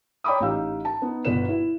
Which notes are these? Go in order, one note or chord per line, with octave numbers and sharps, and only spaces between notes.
C#5 G5 A#5 B5 D6 D#6
A1 D#4 G4 F5 E6
A5
B3 D#4
G1 B2 B4 E7
E4